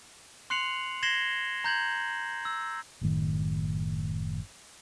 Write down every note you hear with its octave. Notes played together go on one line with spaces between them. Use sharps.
C6 F#6 C7 C#7 F7 F#7
G#6 A#6 C7 E7 F#7 G7
A#5 G6 G#6 F#7
E6
F#1 A2 D#3